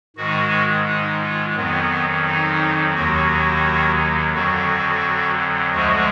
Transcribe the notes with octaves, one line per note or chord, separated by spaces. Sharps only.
G#2 D#3 G#3 F#4
D#4
F4
F2 D#3 F#3 B3
D#4
D#2 D#3 F#3 F#4
F2 D3 F#3 F#4
D2 D3 F3 G#3 F#4